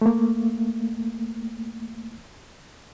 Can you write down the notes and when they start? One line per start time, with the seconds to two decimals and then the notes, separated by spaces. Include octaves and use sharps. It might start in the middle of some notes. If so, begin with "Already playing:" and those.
0.01 A3 A#3